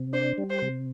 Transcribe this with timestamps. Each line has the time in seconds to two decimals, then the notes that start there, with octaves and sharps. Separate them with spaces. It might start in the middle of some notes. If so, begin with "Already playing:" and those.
Already playing: C3
0.13 D4 C5
0.38 G3
0.50 C5
0.62 C3